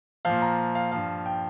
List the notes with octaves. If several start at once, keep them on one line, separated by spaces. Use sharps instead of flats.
A#2 F3 F5
A#5
F5
G2 F3 F5
G5